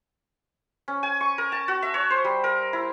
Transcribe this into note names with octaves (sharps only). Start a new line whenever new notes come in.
C#4
G#5
C#6
A#4
A5
F#4
E5
C#5
C5
G3
A#4
E4